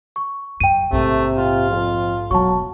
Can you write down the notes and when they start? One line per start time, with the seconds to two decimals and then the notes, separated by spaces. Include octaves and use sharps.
0.16 C#6
0.60 F#2 G5 D#7
0.92 A#1 G#2 C3 A3
1.38 F4
1.70 F2
2.31 E1 D#3 F#3 A5 C#6